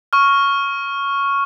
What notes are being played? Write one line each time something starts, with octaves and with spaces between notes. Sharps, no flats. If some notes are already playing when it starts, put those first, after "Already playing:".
C#6 F6